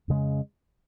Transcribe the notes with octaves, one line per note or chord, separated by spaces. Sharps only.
F2 C#3 G#3